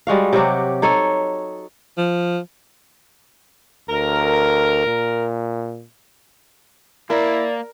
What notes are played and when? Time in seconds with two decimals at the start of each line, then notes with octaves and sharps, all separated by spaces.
0.07 G3 G#3 F#4 F5
0.33 C3 F#3 F#4 G4
0.82 D#4 A4 C#5
1.98 F3
3.89 D2 A#4
4.86 A#2
7.10 A#3 E4 A#4 D5